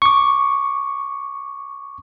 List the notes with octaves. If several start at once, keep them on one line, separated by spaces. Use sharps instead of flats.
C#6 D6